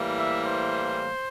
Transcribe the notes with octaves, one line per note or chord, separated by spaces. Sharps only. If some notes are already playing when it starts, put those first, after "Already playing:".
Already playing: A2 E3 G3 A#3
E5
C5